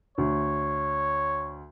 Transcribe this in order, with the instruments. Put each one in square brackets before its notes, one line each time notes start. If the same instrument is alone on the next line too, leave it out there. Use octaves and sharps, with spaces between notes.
[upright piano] D2 [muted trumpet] C#5